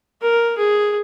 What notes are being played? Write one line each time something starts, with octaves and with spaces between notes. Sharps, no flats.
A#4
G#4